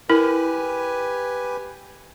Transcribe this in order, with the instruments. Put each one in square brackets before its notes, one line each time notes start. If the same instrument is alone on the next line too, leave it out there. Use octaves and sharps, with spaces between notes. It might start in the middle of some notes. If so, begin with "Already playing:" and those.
[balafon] E4 A#4 [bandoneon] G4 B4 G#5